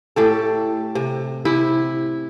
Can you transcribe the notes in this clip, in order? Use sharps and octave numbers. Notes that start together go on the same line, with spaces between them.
A2 G4 A4
C3
C3 E4